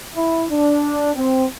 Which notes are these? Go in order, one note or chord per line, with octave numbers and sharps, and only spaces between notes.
E4
D4
C4